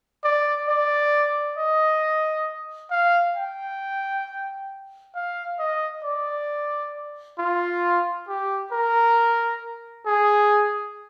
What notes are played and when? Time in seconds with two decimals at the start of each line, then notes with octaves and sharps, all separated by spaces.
0.24 D5
0.68 D5
1.58 D#5
2.91 F5
3.37 G5
5.15 F5
5.59 D#5
6.04 D5
7.39 F4
8.28 G4
8.73 A#4
10.06 G#4